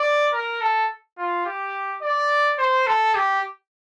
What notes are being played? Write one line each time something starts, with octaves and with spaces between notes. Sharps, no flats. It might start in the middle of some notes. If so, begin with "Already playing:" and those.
Already playing: D5
A#4
A4
F4
G4
D5
C5
A4
G4